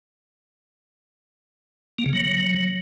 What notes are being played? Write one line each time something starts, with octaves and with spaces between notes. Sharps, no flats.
A#3
C#3
F#3